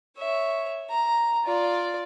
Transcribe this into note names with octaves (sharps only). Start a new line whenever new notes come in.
C#5 E5
A#5
F4 D5